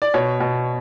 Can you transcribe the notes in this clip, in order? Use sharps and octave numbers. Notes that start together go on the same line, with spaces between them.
D5
B2 C#5
B2